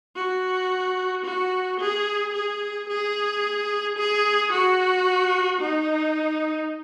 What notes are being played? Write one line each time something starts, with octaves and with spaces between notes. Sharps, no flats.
F#4
F#4
G#4
G#4
G#4
G#4
F#4
D#4